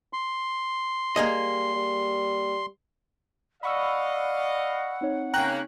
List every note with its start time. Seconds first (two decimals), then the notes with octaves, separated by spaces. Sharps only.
0.13 C6
1.16 G3 A#3 G#4 D#5
1.76 G3
3.63 D5 D#5 F5 F#5 B5 C#6 E6
5.01 C4 D#4 C#5
5.33 C#3 A#3 C#4 G5 A#5 F#6